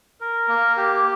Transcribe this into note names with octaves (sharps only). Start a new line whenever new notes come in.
A#4
A#3
G4